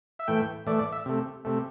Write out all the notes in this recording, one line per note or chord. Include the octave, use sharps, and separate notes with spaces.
E5
A2 E3 A3 G5
A2 E3 A3 D5
D5
E5
C3 A3
C3 A3